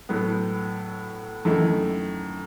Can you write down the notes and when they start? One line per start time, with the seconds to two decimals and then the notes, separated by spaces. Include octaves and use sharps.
0.09 A2 F#3 B3
1.45 F#2 D#3 A3 E4